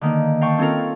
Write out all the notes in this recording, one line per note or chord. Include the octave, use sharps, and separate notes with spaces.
D3 D#3 A#3
F5 G5 A5 C#6
C4 C#4 F4 A4 A#4